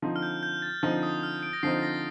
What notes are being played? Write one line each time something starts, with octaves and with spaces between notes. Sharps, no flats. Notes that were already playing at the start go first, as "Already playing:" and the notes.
D3 F3 C4 D#4
F6
G6
G6
A6
D3 F3 C4 D#4 F6
D#6
F6
D7
A#6
D3 F3 C4 D#4 C7
A6
A#6